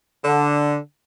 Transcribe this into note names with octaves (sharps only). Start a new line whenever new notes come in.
D3